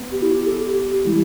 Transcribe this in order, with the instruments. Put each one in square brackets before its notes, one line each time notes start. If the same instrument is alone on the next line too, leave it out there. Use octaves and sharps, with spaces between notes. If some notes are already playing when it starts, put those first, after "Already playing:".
Already playing: [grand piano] B3
[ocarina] G4
E4
G4
A4
G4
[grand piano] E3 G3 [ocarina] E4